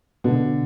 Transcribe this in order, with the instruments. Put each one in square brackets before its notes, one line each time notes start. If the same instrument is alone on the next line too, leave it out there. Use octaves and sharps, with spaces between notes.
[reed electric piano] B2 [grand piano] D3